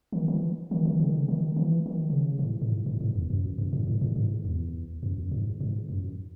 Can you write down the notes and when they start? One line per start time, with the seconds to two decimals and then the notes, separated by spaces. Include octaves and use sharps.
0.12 D#3
0.28 E3
0.71 D#3
0.85 D#3
1.00 C#3
1.08 D#3
1.17 C#3
1.28 D#3
1.56 E3
1.86 D#3
2.10 B2
2.15 C#3
2.39 B2
2.43 A2
2.62 A2
2.72 G#2
2.86 A2
3.01 G#2
3.16 E2
3.30 F#2
3.58 F#2
3.73 A2
3.87 G#2
4.01 A2
4.16 G#2
4.45 E2
5.03 F#2
5.17 E2
5.23 F#2
5.31 G#2
5.60 G#2
5.89 F#2